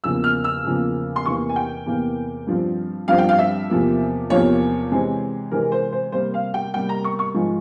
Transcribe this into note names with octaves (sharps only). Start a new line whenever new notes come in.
E2 C#3 F3 A#3 E6
F6
E6
E2 C#3 F3 A#3
C6
E2 C3 E3 A#3 C#6
G#5
G5
E2 C3 E3 A#3
G2 F3 C4
G2 F3 C4 F5
G5
F5
E5
E2 C3 F3 A#3
E2 C3 F3 A#3 C#5
C3 E3 G#3 C4
C3 E3 G#3 C4 A#4
C5
C5
C3 G3 A#3 C5
F5
G5
C3 G3 A#3 G5
A#5
C#6
C#6
G#2 F3 G#3